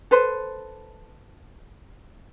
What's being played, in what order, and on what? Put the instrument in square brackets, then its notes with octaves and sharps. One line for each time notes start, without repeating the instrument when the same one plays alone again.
[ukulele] A4 B4 C5